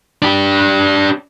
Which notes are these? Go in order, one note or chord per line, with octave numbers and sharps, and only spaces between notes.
D4 G4